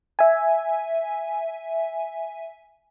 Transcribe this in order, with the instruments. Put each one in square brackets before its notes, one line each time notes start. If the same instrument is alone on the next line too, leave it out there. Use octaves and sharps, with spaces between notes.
[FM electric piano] E5 G#5